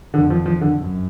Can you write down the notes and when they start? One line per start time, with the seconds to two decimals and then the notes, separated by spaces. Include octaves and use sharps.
0.14 F2 D3
0.30 F3
0.46 F3
0.61 D3
0.78 F#2